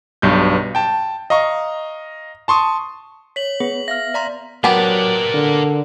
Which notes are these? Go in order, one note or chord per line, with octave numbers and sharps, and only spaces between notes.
B1 G2 G6
G5 A5
D#5 F5 A#5 C#6
A5 C6 C#6 D#6
C#5 B6 F#7
B3 G#4
E5 F5 F6 A#6
D5 A#5 C6 A6 B6
F#3 A#3 B3 D4 G4 A#4 D5
D3